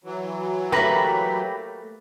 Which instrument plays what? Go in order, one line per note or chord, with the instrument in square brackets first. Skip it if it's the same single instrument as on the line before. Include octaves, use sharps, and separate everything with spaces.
[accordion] E3 F#3
[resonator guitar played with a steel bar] A3 A#3 B4 [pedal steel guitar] G4 A#5 B5